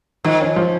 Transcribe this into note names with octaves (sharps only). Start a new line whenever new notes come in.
D#3 F3
C#4
F3